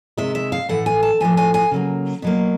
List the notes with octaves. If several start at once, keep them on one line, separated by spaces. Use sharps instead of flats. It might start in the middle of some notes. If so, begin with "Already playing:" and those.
C3 D#3 G#3 E5
E5
F5
A2 E3 A3 F#5
G#5
A5
A2 F3 A3 G#5
G#5
G#5
C#3 F#3 A#3
B2 F#3 A#3